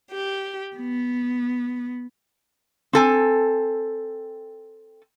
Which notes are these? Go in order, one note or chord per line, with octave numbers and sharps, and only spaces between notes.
G4
B3
C4 A4 G#5